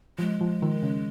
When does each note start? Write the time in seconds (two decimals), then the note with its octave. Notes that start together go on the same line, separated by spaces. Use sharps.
0.19 F3 G#3
0.41 F3
0.62 D#3
0.83 C#3